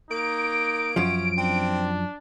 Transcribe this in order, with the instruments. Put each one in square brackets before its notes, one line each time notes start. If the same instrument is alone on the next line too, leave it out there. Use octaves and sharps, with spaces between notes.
[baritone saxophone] A#3 [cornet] D#4 [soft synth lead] D7
[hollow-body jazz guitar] F#2 F3 [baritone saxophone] C#4
[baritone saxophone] C4 [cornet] D4